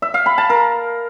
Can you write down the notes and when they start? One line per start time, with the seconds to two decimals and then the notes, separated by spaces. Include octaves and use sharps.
0.02 E5
0.14 F5
0.26 B5
0.38 A5
0.50 A#4